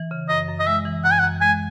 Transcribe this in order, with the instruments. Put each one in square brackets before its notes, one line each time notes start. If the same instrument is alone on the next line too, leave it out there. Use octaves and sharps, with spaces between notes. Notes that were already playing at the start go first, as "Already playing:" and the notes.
Already playing: [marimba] E3
C#3
[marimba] F#2 [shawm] D#5
[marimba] F#2
[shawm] D#5
[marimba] G#3 [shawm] E5
[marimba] E3
[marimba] F#2 [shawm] F#5
[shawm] G#5
F#5
[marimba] F#2
[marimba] G#3 [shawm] G#5